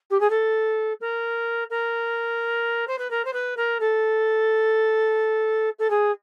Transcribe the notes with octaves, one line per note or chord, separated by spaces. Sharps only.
G4
G#4
A4
A#4
A#4
C5
B4
A#4
C5
B4
A#4
A4
A4
G#4